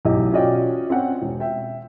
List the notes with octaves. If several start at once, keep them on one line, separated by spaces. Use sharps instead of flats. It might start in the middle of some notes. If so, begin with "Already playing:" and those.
B1 E2 A2 G4 D#5
C#4 F4 F#4 D5 D#5 G5
C4 C#4 F#5 G5
E1
E5 G5